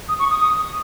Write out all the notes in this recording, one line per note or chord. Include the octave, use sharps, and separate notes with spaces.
D#6
C#6
D#6
D#6